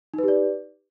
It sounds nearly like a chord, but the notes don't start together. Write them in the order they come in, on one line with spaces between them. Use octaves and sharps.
D#4 B4 G4 D5